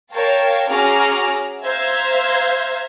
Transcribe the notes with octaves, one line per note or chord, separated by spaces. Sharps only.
A#4 C#5 F5 G5 A5
C#4 F#4 G#4 A#5 D6 F6
C5 E5 F5 A#5 G#6